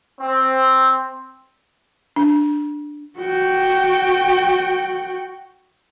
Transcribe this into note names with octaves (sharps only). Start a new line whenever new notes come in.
C4
D4
F#4 G5